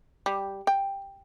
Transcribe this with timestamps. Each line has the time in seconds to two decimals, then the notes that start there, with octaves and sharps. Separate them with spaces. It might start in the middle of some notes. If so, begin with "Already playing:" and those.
0.26 G3
0.67 G5